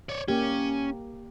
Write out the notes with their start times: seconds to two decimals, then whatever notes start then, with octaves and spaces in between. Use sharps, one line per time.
0.09 C#5 D5
0.28 A#3 C#4 G4